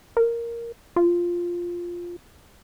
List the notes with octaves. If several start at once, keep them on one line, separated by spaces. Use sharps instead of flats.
A#4
F4